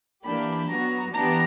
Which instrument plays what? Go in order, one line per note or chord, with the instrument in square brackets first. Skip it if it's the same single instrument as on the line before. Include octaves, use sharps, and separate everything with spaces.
[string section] E3 A#3 D4 G4 [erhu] B5
[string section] F#3 B3 F#4 [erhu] A#5
[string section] E3 B3 D4 G4 [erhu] A#5